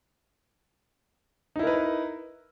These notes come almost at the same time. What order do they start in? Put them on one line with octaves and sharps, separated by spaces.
D#4 E4 A#4 B4